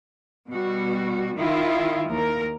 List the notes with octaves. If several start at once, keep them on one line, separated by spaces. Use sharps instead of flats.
B2 G3 F#4
D#3 E4 F4
D#2 A#4